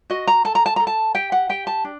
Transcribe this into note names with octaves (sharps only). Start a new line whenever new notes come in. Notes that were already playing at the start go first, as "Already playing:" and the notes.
F#4 D#5
A#5
A4 A5
A#5
A5
A4 A#5
A5
G4 G5
F#5
G4 G5
A5
D4